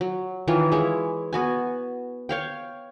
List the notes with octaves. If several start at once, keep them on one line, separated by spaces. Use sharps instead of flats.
F#3
D#3 E3 F4 C#5
G#3 E4 C#5
B3 F#4 G#5
C#5 F5 G5